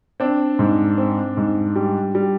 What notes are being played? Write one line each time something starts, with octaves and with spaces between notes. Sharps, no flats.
C4 D4
G#2
C4
G#2
G3
G3